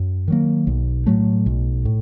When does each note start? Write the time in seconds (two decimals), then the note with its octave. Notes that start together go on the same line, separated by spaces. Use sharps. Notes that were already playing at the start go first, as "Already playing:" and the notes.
Already playing: F#2
0.28 D#3 F#3 A#3
0.67 B1
1.06 A2 F#3 A3
1.46 B1
1.85 A2